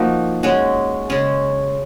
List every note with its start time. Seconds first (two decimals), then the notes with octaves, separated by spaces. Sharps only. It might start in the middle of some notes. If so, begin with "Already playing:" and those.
Already playing: F3 A#3 D#4 F#4
0.43 G#3 C#4 F#4
1.10 C#3 G#3 C#4